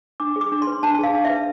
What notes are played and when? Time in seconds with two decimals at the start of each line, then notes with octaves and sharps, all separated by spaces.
0.20 D4 D6
0.36 G#4
0.41 D6
0.52 D4
0.62 C6
0.67 B4
0.83 D4 A5
0.99 G#4 F5
1.14 D4
1.25 B4 E5